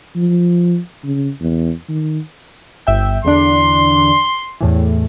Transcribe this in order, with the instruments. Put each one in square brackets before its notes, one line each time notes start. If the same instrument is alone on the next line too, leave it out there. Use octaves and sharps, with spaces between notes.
[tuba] F3
C#3
E2
D#3
[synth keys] G1 E5 G5
[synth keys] E2 D3 D4 [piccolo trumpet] C6
[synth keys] E2 A2 E3